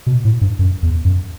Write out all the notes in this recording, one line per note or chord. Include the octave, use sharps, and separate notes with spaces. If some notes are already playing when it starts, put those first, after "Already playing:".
B2
A2
G2
F#2
E2
F#2